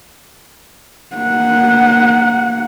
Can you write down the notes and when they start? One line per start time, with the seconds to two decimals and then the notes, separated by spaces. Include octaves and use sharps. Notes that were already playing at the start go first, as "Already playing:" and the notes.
1.16 A#3 F#5